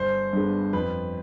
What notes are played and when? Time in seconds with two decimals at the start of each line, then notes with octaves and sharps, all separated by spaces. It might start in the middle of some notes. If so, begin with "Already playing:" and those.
Already playing: G1 C5
0.33 G2 D3 G#3 B3
0.73 F2 B4